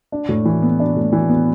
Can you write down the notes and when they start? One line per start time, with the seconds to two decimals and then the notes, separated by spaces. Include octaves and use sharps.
0.12 D4
0.29 A2
0.45 E3
0.62 B3
0.80 D4
0.96 A2
1.12 E3
1.30 B3